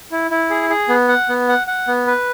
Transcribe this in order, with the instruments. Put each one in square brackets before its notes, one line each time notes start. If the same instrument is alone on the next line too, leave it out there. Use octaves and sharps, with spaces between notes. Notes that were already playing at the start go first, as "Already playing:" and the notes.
[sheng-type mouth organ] E4
E4
G#4
G#4
B3
F#5
B3
F#5
F#5
B3
B4